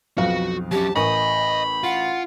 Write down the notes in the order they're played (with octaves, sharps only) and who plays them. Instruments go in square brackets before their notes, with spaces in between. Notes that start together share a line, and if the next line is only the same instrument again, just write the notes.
[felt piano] B1 F2 F5 [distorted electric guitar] F#4 [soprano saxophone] B4
[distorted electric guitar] F#3 C#4 [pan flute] G4 [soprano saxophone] A5
[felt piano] A1 A#4 C#6 [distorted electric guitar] D#5 [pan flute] G#5 [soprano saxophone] B5
[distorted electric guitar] F4 [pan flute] F#5